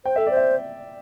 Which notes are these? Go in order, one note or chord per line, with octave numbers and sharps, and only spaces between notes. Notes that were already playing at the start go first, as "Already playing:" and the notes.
C5 G5
A4 E5
C5 D5
E5